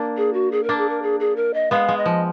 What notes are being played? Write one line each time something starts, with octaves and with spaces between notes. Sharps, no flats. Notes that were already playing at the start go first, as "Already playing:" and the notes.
Already playing: A#3 D4
G#4
F#4
G#4
A#4
A#3 D4
G#4
A#4
G#4
G#4
A#4
D#5
G#3 B3 F5
G#3
D#5
F3